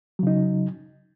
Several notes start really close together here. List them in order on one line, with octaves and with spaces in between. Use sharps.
F#3 C#3 D#4